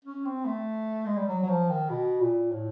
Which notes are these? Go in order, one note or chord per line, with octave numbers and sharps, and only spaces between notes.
C#4
C4
A3
G#3
G3
F#3
F#3
F3
D#3
B2
A#2
A2